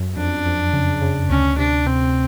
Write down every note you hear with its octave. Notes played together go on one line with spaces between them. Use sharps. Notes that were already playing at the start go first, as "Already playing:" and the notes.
Already playing: F#2
F2 D4
F2
C#3
C#3
D2 C#4
C3 D4
C3 C4